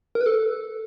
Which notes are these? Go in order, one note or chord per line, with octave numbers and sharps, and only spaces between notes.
A#4
B4
A4